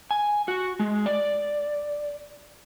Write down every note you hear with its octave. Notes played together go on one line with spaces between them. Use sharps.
G#5
F#4
G#3
D5